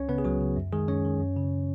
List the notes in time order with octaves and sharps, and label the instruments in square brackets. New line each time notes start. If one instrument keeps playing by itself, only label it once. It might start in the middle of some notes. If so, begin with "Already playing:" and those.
Already playing: [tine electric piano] C#2 C#4 C#5
C#3 B3 B4
G#4
C#2 F#3 F#4
C#3
F#2
D#3 G#3 G#4
F#2 C#4 C#5
D#3
F#2
C#3